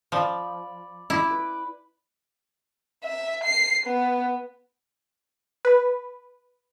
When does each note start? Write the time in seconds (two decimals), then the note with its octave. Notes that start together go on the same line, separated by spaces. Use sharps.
0.12 F3 D5 B5
1.10 E4 B5 D6
1.31 B4
3.04 E5
3.44 C7
3.86 B3
5.65 B4